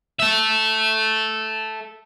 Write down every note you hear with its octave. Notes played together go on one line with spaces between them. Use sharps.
A4 E5